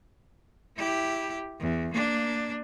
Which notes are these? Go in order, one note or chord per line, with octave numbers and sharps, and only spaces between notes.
E4 G4
E2
A#3 D4